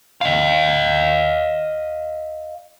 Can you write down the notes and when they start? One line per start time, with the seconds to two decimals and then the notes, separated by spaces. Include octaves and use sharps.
0.21 D#5 F5